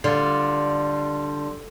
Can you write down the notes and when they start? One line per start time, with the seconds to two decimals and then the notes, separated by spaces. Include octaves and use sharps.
0.04 D3 G3 F4